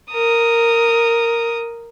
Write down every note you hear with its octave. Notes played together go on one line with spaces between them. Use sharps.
A#4 D#6